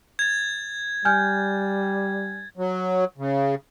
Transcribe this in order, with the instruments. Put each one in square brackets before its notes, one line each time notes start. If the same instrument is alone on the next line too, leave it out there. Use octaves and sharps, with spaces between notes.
[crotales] G#6 A6
[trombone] G3 [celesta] G#5 F6 G6
[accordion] F#3
C#3